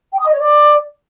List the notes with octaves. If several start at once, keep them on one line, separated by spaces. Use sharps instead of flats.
G5
D#6
D#5
C#5
D5